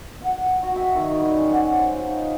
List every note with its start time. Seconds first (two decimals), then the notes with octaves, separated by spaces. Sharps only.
0.21 F#5
0.45 G5
0.63 F#4
0.76 E5
0.95 D#3
1.19 G3
1.35 C#4
1.50 F#5
1.73 C5
1.92 F4
2.07 D#4